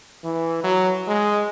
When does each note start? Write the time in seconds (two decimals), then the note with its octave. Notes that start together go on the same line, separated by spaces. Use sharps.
0.24 E3
0.64 F#3
1.07 G#3